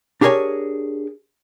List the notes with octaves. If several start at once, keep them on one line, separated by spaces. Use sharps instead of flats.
D4 G4 G#4 A#4 C#5 G#5